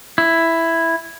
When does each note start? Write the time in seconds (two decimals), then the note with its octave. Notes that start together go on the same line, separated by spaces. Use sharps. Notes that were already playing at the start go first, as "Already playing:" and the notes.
0.18 E4